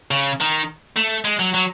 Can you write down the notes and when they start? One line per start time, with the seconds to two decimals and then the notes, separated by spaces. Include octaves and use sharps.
0.11 C#3
0.41 D#3
0.96 A3
1.25 G#3
1.39 F#3
1.54 F#3